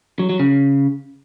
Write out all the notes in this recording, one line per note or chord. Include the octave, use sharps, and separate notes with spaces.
F#3
F#3
C#3